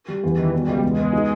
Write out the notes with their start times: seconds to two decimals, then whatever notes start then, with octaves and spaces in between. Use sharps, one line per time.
0.08 G3
0.24 E2 E3
0.38 D#3
0.53 B2 G3
0.68 C#2
0.82 E2 G#3
0.98 B3
1.13 D#4